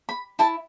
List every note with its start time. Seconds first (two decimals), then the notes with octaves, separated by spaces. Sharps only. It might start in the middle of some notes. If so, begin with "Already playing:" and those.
0.09 B5
0.39 E4 A5